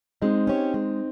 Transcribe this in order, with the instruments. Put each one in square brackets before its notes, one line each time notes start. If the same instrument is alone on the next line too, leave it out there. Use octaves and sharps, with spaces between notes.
[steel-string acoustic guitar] G#3 [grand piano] C4 D#4
[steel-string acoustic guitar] C#4 G4 C#5
G#3